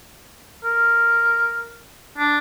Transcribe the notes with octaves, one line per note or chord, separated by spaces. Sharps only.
A#4
D4